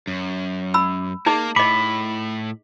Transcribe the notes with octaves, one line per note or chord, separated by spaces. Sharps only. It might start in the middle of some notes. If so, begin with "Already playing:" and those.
F#2
B5 E6
A#3 D#4 G#4 D#5
A2 D#5 B5 D6